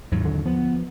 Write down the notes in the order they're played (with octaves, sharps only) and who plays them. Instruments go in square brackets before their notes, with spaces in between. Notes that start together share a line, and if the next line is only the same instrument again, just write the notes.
[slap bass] D#2 F#3 [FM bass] G#2
[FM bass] D3
[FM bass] F3 [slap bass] B3